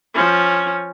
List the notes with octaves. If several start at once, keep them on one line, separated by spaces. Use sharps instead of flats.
F3 C#4